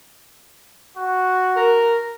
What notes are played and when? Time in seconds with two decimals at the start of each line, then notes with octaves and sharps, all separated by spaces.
0.97 F#4
1.56 A#4